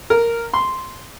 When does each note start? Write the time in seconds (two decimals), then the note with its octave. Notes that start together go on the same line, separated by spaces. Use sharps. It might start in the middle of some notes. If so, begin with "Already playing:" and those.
0.10 A#4
0.54 C6